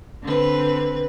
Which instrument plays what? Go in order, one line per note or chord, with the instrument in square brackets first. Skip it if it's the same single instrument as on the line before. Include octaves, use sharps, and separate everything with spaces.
[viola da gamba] D3 C4 B4